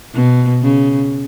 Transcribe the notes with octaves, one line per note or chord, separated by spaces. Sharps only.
B2
C#3